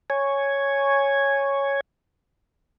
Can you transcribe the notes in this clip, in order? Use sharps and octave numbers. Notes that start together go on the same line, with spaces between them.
C#5 G#5